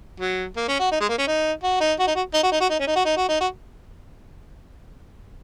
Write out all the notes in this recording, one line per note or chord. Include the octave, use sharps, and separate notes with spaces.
F#3
A#3
C#4
F#4
D#4
G#3
A#3
C#4
D#4
F#4
D#4
F#4
D#4
F#4
D#4
F#4
D#4
F#4
D#4
C#4
D#4
F#4
D#4
F#4
D#4
F#4